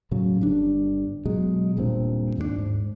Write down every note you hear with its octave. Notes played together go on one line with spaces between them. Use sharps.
A2 C#3 F#3
G1 G2 D4
B2 F#3 G#3
D#1 G2 A#2 C4
D#2 G#2 G3 D4
G#2